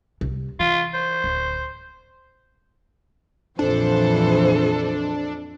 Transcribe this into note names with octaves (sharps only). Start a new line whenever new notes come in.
C2
E3 F4
C5
D1
A#1 F2 E3 F3 D4 A4 C5